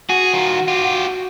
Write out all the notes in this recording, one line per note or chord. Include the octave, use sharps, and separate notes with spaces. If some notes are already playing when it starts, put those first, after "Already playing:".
F#4 G#4
D#3 F4
F4 G4